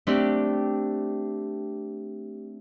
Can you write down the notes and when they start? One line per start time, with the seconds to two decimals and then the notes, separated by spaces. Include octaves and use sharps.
0.07 A3 C4 D4 G4 D5